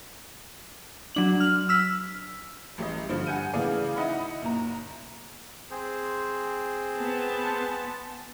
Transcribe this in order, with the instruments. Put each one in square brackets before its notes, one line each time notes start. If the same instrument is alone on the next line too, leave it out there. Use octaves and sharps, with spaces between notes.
[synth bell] F#3 D4 F#7
F6 F#7
E6 F6 B6
[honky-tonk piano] A1 G3 D#5
G2 D3 F3
F#5 G#5 G6 D#7
A2 C#3 E3 B3 D5 F5
D#4 E4 D#5 F#5 B5
F#1 A#2 A#5
[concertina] C4 G#4 C5
[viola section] B3 A5